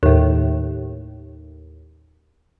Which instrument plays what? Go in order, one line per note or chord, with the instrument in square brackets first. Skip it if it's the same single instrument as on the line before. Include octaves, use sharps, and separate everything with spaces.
[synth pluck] D#2 A2